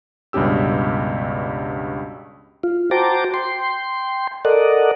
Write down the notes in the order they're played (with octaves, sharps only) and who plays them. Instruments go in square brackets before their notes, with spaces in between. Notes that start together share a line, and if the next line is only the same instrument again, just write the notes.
[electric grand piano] C#2 G2 B2 C#4 G4 E6
[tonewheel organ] F4
F#4 C5 G5 A5 A#5 D6
G5 C6
A4 A#4 D5 D#5 F#5